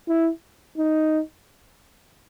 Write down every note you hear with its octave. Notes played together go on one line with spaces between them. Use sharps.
E4
D#4